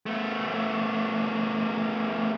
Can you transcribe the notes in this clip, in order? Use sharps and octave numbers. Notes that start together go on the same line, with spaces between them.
A3 B3